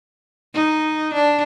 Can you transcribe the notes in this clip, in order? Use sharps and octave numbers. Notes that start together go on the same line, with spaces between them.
D#4
D4